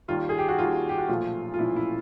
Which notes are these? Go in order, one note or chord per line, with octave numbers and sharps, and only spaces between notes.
D#2 D#3 G3 F4
G#4
G4
F#4
D#2 D#3 G3 F4
G4
F#4
B1 A#2 F3 A3 F4
F4
B1 A#2 F3 A3 E4
E4